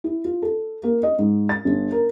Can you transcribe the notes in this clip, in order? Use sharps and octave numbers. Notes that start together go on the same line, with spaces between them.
E4
F4
A4
A#3
D#5
G#2
A6
G1
A#4